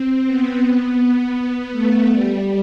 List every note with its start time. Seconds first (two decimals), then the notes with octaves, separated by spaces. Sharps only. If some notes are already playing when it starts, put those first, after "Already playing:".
Already playing: C4
0.26 B3
1.00 B3
1.72 A3
2.09 G3